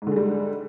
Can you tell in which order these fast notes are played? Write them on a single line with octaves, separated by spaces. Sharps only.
G#2 D3 G#3 G3